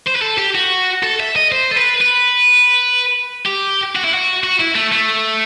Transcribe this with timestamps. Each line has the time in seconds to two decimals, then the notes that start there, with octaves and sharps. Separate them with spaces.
0.07 C5
0.15 B4
0.22 A4
0.38 G4
0.55 F#4
1.03 A4
1.20 E5
1.36 D#5
1.52 C5
1.71 A4
1.76 B4
2.01 B4
3.46 G4
3.95 F#4
4.04 E4
4.13 F#4
4.44 F#4
4.60 E4
4.75 A3
4.93 A3